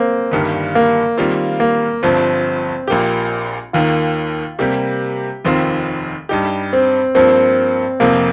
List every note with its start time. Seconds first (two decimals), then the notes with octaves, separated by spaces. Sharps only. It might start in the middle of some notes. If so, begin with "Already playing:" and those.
Already playing: A#3 C4
0.31 G1 G2 D#3 G3
0.75 A#3
1.18 D#3 G3 C4 F4
1.60 A#3
2.03 G1 G2 F3 C4
2.88 A#1 A#2 A#3 G4
3.73 D#2 D#3 A#3 F4
4.59 C3 G3 A#3 G4
5.45 F1 D#2 D#3 C4 F4
6.29 G2 G3 D#4 G4
6.73 C4
7.15 G2 F3 A#3 C4
8.00 F1 F2 C3 A#3